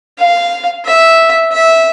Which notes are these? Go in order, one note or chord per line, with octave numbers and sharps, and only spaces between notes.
F5
E5
E5